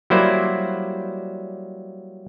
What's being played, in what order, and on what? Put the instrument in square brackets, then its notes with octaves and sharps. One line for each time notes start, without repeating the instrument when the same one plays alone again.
[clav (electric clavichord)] F#3 G3 A#3 E4 C5 D5